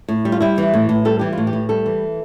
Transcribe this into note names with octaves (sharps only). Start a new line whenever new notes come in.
A2
G3
F4
G3 E4
E3
A2
A2
G3 A4
E3 G4
A2 F4
G4
A2
G3 A4
E3